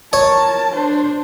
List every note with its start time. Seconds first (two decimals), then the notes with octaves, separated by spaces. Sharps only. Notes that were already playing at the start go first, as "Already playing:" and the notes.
0.13 A#4 C#5 A5
0.75 D4 C5